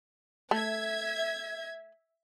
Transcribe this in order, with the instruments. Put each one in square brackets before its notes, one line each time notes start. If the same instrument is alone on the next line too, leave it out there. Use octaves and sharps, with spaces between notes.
[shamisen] A3 [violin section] E5 G#6